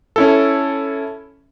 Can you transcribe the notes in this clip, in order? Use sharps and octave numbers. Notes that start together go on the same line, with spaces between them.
C#4 E4 A4